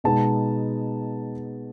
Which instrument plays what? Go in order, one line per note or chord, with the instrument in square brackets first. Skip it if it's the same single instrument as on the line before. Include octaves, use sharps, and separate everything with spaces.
[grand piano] B2 G#3 B3 D#4 A5